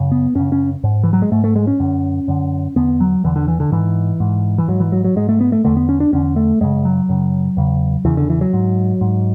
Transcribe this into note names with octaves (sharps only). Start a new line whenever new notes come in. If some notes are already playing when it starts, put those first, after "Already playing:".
Already playing: F#2 C#3
B3
F#2 C#3 C#4
C#4
G#2
E3
F#3
G#3
G#2 A3
A3
G#3
C#4
F#2 D3
F#2 D3
E2 D3 B3
F#3
E2 D3 E3
D3
E3
D3
G#2 E3
G#2
E3
G#2 F#3
E3
F#3
F#3
G#2 G#3
A3
B3
A3
E2 D3 A3
B3
C#4
D4
E2 D3 C#4
A3
F#2 C#3 G#3
F#3
F#2 C#3
E2 C#3
E2 C#3 E3
D3
E3
F#3
G#2
G#2